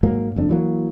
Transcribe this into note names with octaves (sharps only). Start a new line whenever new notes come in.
G#2 F#3 A#3
F#1 F2 D4
E3 F#3 A#3